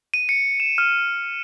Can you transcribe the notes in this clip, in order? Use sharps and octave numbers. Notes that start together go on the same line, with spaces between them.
D#7
C#7
E7
F6